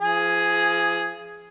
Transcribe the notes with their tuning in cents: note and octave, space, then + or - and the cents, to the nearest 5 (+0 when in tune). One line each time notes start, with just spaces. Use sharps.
F3 -35 G#4 +5